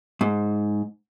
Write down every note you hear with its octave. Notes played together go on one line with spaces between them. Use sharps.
G#2